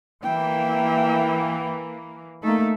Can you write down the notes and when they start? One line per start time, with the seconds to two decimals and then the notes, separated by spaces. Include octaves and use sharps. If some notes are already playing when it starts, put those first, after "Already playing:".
0.23 E3 A#3 E5 G5
2.43 A3 A#3 D#4 A4